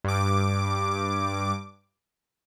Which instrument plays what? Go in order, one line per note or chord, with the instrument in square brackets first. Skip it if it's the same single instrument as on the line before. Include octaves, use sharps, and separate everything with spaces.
[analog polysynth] G2 D6